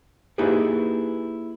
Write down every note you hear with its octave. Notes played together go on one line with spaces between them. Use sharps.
A#3 D#4 E4 G4 G#4 B4